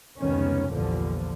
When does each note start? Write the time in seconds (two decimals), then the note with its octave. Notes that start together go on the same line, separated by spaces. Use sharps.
0.19 F1 C#2 C3 D#3 B3 C#4
0.71 A#1 E2 G2 A#2 D3 F3